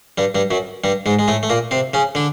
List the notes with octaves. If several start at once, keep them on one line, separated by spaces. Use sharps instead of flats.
G2 G3
G2 G3
F#2 F#3
G2 G3
G#2 G#3
G#3
A2 A3
A3
A#2 A#3
C3 C4
C#3 C#4
D3 D4